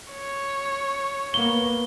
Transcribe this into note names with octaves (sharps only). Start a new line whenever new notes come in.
C#5
A#3 B3 G7